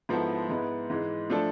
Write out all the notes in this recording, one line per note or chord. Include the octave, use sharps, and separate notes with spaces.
G#2 F3 B3 E4 A4
G#2 G#3 B3 E4 B4
G#2 E3 G#3
F3 A3 D4 A4 D5